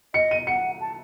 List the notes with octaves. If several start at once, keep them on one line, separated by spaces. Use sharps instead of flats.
D#5 C#7
D#7
F#5 C#7
A5